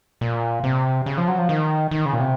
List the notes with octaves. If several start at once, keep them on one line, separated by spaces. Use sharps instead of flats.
A#2
C3
C#3
F3
F#3
F3
D#3
D#3
C#3
A#2
C3